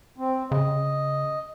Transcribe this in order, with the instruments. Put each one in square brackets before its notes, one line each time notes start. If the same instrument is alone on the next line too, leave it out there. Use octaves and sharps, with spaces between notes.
[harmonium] C4
[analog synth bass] C#3 [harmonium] D#5